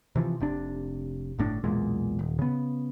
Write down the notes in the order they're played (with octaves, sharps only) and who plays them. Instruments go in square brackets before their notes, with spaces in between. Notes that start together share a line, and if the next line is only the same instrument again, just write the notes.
[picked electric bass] C3 E3 F3
F1 C3 D4
G1 A2 D4
B1 E2 A#2 G#3
D#1
C#3 B3